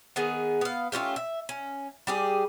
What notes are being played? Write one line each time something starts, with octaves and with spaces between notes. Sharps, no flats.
D#3 B3 G#4
B3 F5
A3 C#4 F4 G4
E5
C#4
G3 G4 G#4